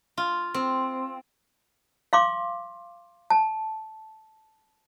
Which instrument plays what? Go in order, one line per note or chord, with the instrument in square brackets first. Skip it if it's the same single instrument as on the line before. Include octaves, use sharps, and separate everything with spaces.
[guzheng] F4
C4
[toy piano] F5 C6 D6
A5